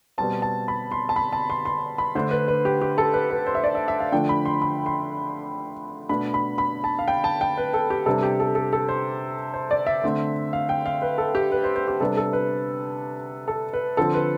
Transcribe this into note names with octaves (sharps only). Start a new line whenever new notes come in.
B2 G3 C4 A5
A5
B5
C6
A5
B5
A5
C6
C6
B5
D3 A3 D4 C5
B4
B4
G4
G4
A4
B4
B4
C5
E5
D5
E5
E5
F5
D3 F3 A3 D4 G5
B5
C6
B5
C6
B2 A3 D4 B5
B5
B5
A5
F5
G5
A5
G5
B4
A4
G4
C3 G3 B3 D4 A4
G4
A4
A4
A4
C5
C5
D5
E5
D3 A3 C4
F5
G5
F5
B4
A4
G4
B4
C5
C5
G4
C3 G3 B3 D4 A4
A4
B4
A4
B4
D3 F3 C4 A4
B4